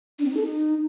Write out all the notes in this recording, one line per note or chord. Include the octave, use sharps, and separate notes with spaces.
D4
C4
D#4
A4
D#4